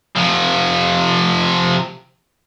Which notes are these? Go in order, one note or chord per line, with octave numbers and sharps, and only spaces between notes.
C3 F3